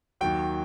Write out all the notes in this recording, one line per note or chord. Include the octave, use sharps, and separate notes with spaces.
D#2 D#3 F#3 G5